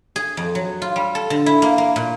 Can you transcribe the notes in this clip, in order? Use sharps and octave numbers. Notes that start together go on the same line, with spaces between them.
G#4
F2
F#3
F4
G3
A4
D3
E4
A#3
A#3
A#2